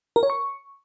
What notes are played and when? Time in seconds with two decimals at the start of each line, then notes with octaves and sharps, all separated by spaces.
0.16 A#4
0.23 C#5
0.30 C#6